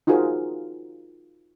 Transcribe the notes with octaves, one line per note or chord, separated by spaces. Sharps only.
D#4 F4 F#4 G#4 A#4 C5